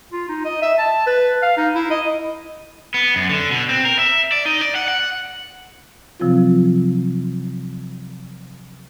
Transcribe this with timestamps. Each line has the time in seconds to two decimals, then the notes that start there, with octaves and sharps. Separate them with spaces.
0.12 F4
0.29 D#4
0.45 D#5
0.62 E5
0.79 A5
1.07 B4
1.43 F5
1.57 D#4
1.75 E4
1.91 D#5
2.94 B3
3.16 F#2
3.30 D3
3.51 B2
3.69 C4
3.85 A#4
3.99 E5
4.32 D5
4.46 D#4
4.61 D5
4.75 F#5
4.88 F#5
6.20 C3 F3 F#3 C4 F4